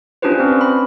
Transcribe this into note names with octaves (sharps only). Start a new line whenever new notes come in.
C#4 D4 F4 G4 B4 C5
C4
B5